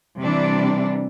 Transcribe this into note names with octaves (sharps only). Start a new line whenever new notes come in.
C3 E3 G3 D4